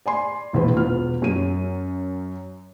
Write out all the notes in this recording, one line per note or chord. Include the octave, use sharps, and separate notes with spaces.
D5 G#5 C6
E1 A#1 E3 E4 B4 C5
E1 B3 F4 F6
F#2 F#3 D#7